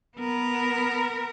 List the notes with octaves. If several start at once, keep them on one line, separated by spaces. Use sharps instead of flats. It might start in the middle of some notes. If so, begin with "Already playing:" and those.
B3 A#4